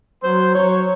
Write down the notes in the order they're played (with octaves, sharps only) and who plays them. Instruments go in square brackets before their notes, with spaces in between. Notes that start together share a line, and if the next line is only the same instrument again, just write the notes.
[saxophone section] F#3 C5
F#3 C#5